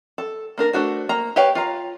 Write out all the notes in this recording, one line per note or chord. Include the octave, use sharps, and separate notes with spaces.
A4
A#3 D4 A#4
A3 D4 F#4 C5
A#3 A#5
G4 B4 C#5 F5 G5
F4 F5 A#5